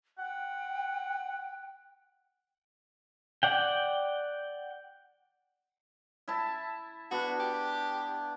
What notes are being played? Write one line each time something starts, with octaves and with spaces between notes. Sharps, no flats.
F#5 G5
D5 F#5 G5
E4 E5 A5
B3 D4 F#4
G4